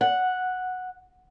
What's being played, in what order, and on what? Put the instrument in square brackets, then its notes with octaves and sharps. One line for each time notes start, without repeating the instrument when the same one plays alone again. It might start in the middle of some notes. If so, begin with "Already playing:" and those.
[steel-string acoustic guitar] F#5